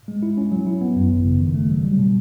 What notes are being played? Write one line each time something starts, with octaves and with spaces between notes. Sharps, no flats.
G#3
E4
C#4
F#3
E4
B3
F#2
G#1
C#3
D#3
A3
F#3
G3
B2